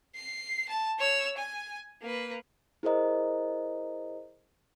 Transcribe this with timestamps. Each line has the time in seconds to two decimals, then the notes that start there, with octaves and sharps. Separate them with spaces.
0.15 C7
0.69 A5
0.99 C#5 E6
1.38 G#5
2.02 A#3 B4
2.83 E4 G#4 A#4 C5 D#5 A#5